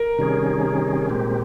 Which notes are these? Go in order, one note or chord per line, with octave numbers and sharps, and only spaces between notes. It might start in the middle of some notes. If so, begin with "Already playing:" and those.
Already playing: A#4
C3 D#3 G3 C#4 G#4
A#2 G#3 C4 G4